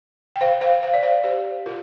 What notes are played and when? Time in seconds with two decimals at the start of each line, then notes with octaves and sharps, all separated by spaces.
0.36 G5
0.41 C5 F5
0.61 C5 F5
0.82 C5 F5
0.94 D5
1.03 C5 F5
1.23 G4 C5
1.66 F4 A#4